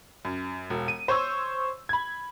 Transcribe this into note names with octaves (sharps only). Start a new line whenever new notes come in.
F#2
E1
D#7
C5 C#5 C6 C#6 E6
B5 G#6